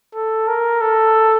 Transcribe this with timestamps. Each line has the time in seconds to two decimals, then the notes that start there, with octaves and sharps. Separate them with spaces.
0.15 A4
0.48 A#4
0.81 A4